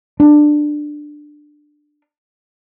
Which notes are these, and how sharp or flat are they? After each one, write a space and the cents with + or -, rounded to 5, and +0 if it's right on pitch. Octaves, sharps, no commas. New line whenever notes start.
D4 +15